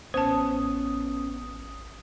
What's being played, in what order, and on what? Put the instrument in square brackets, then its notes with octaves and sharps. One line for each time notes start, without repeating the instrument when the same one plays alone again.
[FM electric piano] A1 D#6 [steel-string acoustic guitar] B3 C#4 [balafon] C5 A5